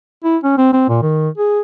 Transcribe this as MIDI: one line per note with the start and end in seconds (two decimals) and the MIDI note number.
0.24 0.37 64
0.44 0.54 61
0.58 0.72 60
0.73 0.84 60
0.89 0.99 46
1.02 1.29 51
1.38 1.60 68